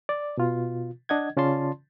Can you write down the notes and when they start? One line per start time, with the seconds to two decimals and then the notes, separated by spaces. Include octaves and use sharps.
0.09 D5
0.37 B2 F4
1.09 D4 D#5 F#5 G#6
1.37 C#3 C#4 F4 D5 A5 C6